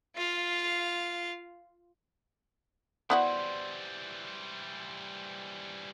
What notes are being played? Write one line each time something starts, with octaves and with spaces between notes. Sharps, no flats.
F4 F5
E3 G3 B3 E4 F#4 C5 D5 F#5